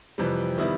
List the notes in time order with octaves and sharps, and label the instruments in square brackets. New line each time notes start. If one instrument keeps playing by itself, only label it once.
[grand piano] F2 C3 E3 G3
D#3 G3 B3 E4